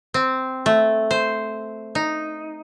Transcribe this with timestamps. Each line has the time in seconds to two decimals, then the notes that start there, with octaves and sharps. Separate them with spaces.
0.14 C4
0.66 A3
1.11 C5
1.95 D#4